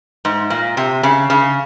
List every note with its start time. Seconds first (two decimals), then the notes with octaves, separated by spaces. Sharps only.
0.25 G#2
0.50 A#2
0.77 C3
1.03 C#3
1.30 C#3